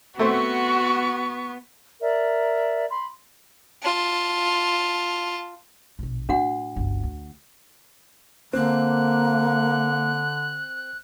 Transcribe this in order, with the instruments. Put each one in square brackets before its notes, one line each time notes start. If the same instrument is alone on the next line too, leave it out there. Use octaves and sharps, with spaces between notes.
[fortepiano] A3 C4 C5 [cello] B3 [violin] F#4 [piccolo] C#6
[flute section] A#4 D5 E5
B5 C6
[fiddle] F4 A5
[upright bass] A#1 B2
[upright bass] A2 [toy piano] D4 F#4 F#5
[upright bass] G1 C#2
D2
[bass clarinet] D3 [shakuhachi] A#3 [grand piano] C4 [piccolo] F#6